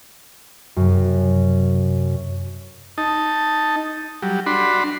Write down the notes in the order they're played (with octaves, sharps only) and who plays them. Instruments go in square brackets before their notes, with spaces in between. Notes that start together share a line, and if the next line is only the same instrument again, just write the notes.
[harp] F#2 C3
[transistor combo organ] D#4 A5
F#3 G3
D4 F#4 B5 C6